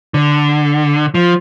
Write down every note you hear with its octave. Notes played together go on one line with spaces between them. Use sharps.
D3
F3